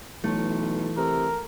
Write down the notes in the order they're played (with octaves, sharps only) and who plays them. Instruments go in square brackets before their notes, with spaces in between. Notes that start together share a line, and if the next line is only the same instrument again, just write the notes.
[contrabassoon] B1 [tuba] E3 [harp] A3
[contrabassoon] C3 [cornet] A#4